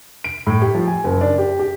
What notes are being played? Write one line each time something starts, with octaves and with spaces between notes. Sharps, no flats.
D7
A2
G4
F3
G#5
F#1
D4
G4
G4